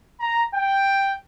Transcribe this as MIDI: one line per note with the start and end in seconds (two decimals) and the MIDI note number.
0.20 0.43 82
0.55 1.13 79